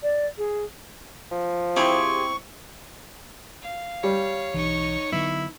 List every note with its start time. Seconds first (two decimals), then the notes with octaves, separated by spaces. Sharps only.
0.03 D5
0.38 G#4
1.31 F3
1.76 C4 E4 G4 G#4 C6 C#6
3.61 F5
4.04 G3 C#5
4.54 B1 E3 D#4 C#6
5.12 D3 F#3 B3 E4